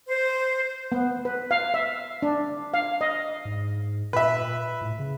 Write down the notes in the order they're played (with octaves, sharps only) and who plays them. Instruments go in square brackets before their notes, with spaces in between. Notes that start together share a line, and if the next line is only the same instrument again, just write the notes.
[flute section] C5
[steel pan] B3
B4
F5
E5
D4
F5
D#5
[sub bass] G#2
[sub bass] A#2 [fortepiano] B4 E5
[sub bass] A2
C#3